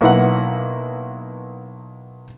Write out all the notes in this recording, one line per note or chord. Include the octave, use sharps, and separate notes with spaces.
B1 A#3 E4 B4 F#5